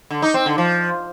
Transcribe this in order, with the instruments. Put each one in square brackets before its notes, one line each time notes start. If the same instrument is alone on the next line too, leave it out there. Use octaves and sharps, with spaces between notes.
[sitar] D3
D#4
C4
D3
F3